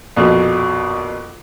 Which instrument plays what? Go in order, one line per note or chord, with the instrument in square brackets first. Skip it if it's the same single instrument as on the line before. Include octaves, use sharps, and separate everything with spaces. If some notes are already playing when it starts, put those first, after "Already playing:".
[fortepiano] A#1 F2 B2